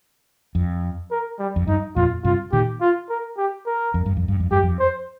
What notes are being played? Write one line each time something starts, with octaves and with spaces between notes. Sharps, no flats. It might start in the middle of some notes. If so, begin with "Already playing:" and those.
F2
A#4
G3
F2
G2 D#4
F2 A#2 F4
G2 C3 F4
A#2 D#3 G4
F4
A#4
G4
A#4
F2
G2
F2
G2
F2
G2 G4
F2
C5